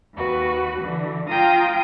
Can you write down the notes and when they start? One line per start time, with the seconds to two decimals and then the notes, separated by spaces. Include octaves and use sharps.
0.15 D#2 F#4 B4
0.82 D3 E3
1.30 F4 G5 A#5 D#6